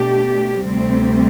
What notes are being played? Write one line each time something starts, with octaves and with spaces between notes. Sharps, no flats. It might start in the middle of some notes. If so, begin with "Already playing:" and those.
Already playing: B2 A3 D4 G4
D2 C3 G3 C4